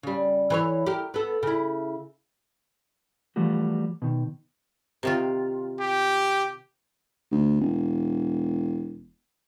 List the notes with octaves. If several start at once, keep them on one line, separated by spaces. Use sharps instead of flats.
C#3 G3
E3 B4 C#5
G4 A#4
B3 A4
C#3 E4
E3 F3 G3 A3 F#4
B2 D#3
C3 D#3 F4
G4
D2
E1